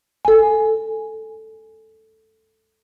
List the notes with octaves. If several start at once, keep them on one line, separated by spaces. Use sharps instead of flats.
A4 G#5